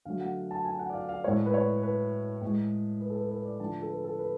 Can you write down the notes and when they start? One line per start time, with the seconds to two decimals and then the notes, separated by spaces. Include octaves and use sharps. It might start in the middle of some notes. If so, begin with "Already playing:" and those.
0.05 D3 F#3 A3 F5
0.20 F#5
0.51 A5
0.65 G#5
0.79 F#5
0.90 D5
0.94 F5
1.09 F5
1.24 A2 G#3 C#5
1.46 B4
1.54 C#5
1.83 B4
2.42 A2 G#3
3.01 B4
3.10 A4
3.16 B4
3.31 B4
3.45 D5
3.60 D3 F3 A3 A5
3.82 A4
3.89 B4
4.04 A4
4.19 B4